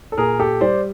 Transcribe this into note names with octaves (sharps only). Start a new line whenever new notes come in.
A4
A#2 G#4 A#4
G4 A4
G3 C5 D5